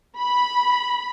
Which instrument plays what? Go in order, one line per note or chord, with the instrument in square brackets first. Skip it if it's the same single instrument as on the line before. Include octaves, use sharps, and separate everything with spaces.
[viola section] B5